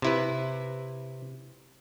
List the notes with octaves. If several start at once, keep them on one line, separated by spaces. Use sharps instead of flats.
C3 E4 B4